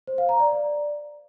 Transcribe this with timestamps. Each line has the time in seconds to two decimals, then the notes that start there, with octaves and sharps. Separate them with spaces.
0.07 C5
0.18 F5
0.29 A#5
0.40 D5